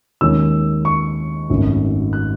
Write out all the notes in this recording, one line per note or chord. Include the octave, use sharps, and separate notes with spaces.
D#2 D#3 G#3 C#4 E6
C#6
G#1 F#2 D#3 F#3 A3
F#6